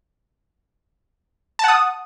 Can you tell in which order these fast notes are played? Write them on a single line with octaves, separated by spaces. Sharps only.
A5 F#5 D#6